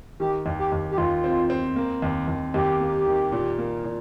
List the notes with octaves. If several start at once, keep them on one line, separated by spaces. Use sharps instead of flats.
D#3 G4
D#2
G4
D#2
G4
D#2 F4
C4
C4
A#3
D#2
D#2
D#2 G4
A#3
D#3
A#2
A#3
A#2